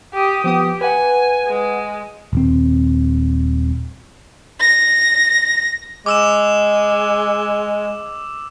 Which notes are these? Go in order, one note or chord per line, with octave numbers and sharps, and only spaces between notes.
G4 D#6
F3 B3 G4 D#6
B4 F#5 G#5
G#3
D#1 C4
A#6
G#3 D6 E6 E7